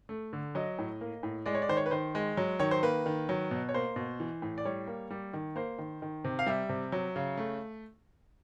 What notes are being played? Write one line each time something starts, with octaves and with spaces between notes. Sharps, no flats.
A3
D3
F#3 D#5
A2
A#3
A2
G#3 D5
C#5
D5
D#3 C5
C#5
B4
D#3 C5
G#3
F#3
D#3 C#5
C5
A#3 B4
D#3
F#3
B2
C#5
A#3 C5
B2
E3
A2
D5
G3 C#5
A#3
G3
D#3
A#3 C5
D#3
D#3
C3
F5
G3 E5
C3
F#3
C#3
A3